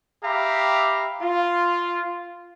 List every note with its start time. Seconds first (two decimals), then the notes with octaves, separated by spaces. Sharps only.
0.24 G4 E5 F5 A#5 B5
1.22 F4